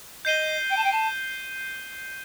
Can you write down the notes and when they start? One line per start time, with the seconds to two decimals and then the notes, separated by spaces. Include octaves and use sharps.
0.25 D#5 G6 C7 D#7 G7
0.70 G5
0.76 A5
0.84 G5
0.92 A5